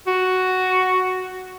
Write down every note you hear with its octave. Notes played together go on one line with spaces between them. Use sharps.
F#4